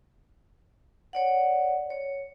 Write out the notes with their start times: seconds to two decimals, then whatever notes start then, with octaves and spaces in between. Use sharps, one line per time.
1.13 C#5 D5 F#5
1.90 C#5